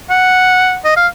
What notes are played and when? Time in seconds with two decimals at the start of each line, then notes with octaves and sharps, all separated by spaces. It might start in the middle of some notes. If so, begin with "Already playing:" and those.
0.10 F#5
0.85 D#5
0.96 F5